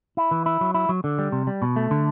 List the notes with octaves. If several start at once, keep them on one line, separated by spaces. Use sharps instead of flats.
E4
E3
E4
F#3
E4
F#3
D3
G3
C3
G3
B2
A3
D3